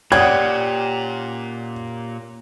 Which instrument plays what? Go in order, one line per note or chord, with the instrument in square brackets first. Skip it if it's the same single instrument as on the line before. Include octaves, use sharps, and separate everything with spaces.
[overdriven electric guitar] A#2 [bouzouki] C#4 G4 [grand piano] D5 F#5 D#6 [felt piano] G#6